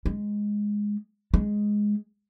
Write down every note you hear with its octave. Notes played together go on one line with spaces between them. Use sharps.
G#3
G#3